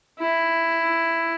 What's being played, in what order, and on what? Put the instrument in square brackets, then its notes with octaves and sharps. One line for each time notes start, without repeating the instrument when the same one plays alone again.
[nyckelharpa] E4